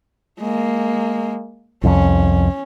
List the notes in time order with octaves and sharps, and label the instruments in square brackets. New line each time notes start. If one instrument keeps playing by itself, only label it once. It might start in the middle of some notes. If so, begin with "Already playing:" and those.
[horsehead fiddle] G#3 A#3
[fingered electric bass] C2 F2 [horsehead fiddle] C#4